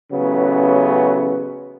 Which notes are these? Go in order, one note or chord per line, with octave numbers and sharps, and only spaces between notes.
A1 C#3 F#3 B3